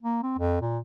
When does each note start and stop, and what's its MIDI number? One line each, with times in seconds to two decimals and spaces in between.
0.02 0.19 58
0.23 0.36 60
0.38 0.60 41
0.61 0.79 46